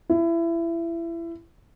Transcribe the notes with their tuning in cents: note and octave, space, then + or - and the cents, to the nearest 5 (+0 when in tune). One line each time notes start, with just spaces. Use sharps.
E4 +25